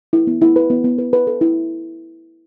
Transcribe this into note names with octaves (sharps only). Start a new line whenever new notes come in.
E4
B3
E4
B4
B3
B3
B4
B4
A4
E4